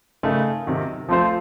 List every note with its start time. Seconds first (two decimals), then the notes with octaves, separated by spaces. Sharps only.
0.23 C#3 A3 D#4 A#4
0.67 C3 D#3 F#3
1.09 F3 A3 C4 F4 C5